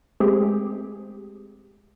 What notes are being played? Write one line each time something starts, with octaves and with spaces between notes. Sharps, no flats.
G#3 A3 C4 G4 G#4